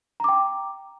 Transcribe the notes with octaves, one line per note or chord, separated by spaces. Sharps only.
G5 A#5 D6